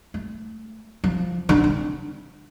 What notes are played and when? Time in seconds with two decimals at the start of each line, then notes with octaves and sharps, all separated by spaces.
0.14 A3
1.04 F3
1.49 D3
1.64 C4